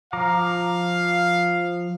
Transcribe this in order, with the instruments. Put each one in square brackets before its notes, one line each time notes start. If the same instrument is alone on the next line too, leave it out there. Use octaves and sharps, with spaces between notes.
[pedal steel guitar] F3 A#5 D6 [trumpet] F5